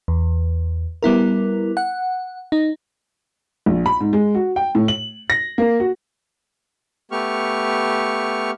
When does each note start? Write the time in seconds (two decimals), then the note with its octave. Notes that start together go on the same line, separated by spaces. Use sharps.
0.08 E2
1.03 G3 B3 E4 A#4
1.77 F#5
2.52 D#4
3.66 A#1
3.86 B5
4.01 G#2
4.13 G#3
4.35 F#4
4.56 G5
4.75 A2
4.88 F#7
5.30 A#6
5.58 A#3
5.80 F#4
7.12 A3 B3 G4 C#6 F6